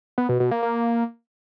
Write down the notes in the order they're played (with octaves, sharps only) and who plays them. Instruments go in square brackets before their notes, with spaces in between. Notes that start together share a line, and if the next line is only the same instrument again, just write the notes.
[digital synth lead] B3
B2
B2
A#3
A#3